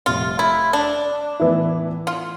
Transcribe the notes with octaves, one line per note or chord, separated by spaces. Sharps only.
F1 F2 C3 G3 C4 F4
E4
D4
A2 E3 B3 E4
F4